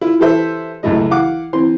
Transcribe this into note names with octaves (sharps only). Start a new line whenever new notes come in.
E4 F4
E3 G4 A4 B4 C5 E5
C#2 F#2 A2 A3 E4 D#5
E3 F5 F#5 D6
E3 C4 C6